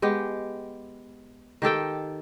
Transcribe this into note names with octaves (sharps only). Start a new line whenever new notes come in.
G#3 B3 G4
D#3 G4 A4 G5